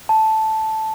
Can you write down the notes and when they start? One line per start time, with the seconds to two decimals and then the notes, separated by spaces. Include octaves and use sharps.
0.09 A5